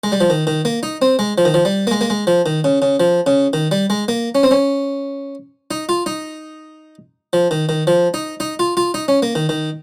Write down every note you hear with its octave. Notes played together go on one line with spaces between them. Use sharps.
G#3
G3
F3
D#3
D#3
A#3
D#4
C4
G#3
F3
D#3
F3
G3
A#3
G#3
A#3
G#3
F3
D#3
C#3
C#3
F3
C#3
D#3
G3
G#3
A#3
C#4
C4
C#4
D#4
F4
D#4
F3
D#3
D#3
F3
D#4
D#4
F4
F4
D#4
C#4
A#3
D#3
D#3